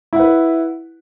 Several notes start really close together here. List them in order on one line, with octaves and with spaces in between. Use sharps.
E4 F#5 B4